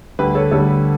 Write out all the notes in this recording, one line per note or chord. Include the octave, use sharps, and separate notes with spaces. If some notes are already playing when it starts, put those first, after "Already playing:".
D2 D3 G3 G4 B4
A4 C#5
D2 D3 G3 A4 C#5